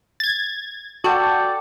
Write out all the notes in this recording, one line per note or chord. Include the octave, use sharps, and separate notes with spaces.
G#6 A6
F#4 A4 D5 G5